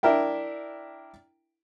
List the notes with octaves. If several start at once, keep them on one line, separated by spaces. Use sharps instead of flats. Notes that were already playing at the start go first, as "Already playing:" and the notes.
D4 E4 A#4 E5 G5